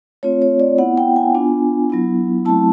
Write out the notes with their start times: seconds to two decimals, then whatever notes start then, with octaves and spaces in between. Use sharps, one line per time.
0.23 A3 C4 F4 C#5
0.42 C#5
0.60 D5
0.78 B3 E4 F#5
0.98 G5
1.16 G#5
1.34 B3 D4 F4
1.90 F#3 B3 E4
2.45 F#3 A3 C4 E4 A5